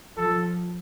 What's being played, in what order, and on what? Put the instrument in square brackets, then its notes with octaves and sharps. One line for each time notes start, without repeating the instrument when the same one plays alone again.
[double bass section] F3 [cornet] A4